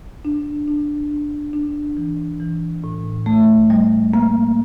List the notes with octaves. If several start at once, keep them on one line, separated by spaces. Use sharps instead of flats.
D4
D4
D4
D4
E3
E3
A2
A3
G3
A#3